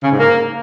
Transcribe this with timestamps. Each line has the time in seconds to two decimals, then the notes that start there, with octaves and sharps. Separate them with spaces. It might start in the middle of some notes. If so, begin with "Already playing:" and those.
0.04 C#3
0.12 G#2
0.20 A#3